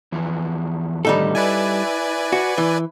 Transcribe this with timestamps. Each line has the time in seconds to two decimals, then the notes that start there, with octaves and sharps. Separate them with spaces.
0.12 E2 E3 F3
1.05 A2 D3 D#3 G3 D#4 A4
1.35 E4 B4 D5 G#5
2.33 F#4
2.58 E3